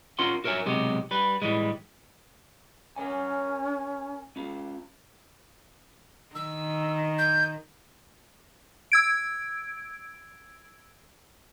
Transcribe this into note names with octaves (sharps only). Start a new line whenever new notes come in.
C#4 F4 A#4 F#5 C6
F#4 A#4 C#5 E5 G#5
B1 C3 G#3 F#4 G4
G3 B4
A2 E3 G3 G#3
C#4 A#4 C#5 G#5
C#4 F4
D#3 E6
G6
E6 G#6 D7